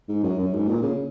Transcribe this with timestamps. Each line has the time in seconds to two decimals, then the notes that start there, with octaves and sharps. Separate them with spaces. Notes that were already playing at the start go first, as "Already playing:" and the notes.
0.09 G#2
0.23 F#2
0.39 F#2
0.53 G#2
0.69 A#2
0.83 C#3